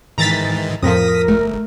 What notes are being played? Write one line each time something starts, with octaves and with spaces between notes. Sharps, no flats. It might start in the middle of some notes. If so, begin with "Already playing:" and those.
G#2 D#3 E3 A#5 A6 B6
F2 A2 F3 A#4 D#6 A#6 B6
G1 A3